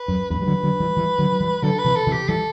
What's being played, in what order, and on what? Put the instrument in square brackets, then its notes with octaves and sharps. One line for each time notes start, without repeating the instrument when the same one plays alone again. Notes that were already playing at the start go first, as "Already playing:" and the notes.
Already playing: [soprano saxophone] B4
[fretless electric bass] F#2
[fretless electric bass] E2 G2 [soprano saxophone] B4
[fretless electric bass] G3
D3 F#3
D3 F#3
E3 G3
E3 G3
D3 F#3
F#3
E3 G3
[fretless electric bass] D3 F#3 [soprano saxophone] A4
[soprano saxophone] B4
[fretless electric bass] C3 E3
[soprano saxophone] A4
[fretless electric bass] C3 E3
[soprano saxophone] G4
[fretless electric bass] E3 G3 [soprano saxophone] A4